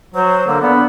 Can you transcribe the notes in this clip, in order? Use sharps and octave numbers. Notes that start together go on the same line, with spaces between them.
F#3 C5
D3 A#3
B3 D4